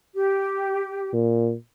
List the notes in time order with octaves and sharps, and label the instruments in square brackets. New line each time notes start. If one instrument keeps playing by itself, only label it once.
[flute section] G4
[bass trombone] A#2